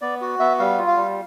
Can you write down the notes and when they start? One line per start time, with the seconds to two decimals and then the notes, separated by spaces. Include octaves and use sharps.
0.01 B3 D5
0.21 F#4
0.39 B3 E5
0.59 G3 F5
0.78 F4
0.88 F5
0.97 G3